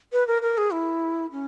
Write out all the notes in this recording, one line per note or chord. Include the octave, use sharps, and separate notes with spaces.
B4
A#4
A#4
G#4
E4
C#4